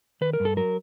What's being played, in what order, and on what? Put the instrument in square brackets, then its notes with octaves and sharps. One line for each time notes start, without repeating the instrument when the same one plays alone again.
[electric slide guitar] D#3 B4
A#4
G2
A4
F#3 A#4